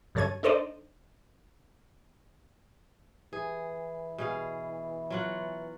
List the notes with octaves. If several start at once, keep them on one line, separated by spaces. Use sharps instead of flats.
G2 C#3 A4 C#5 G#6 D#7
D4 D#4 A4 C5 D5 D#5
E3 G#4
B2 G#4 F5
F#3 F4 F#5